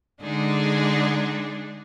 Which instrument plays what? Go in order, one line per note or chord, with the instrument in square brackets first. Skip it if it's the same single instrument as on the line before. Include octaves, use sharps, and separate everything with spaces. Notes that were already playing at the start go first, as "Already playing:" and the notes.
[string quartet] D3 G#3 D4 D#4 G#4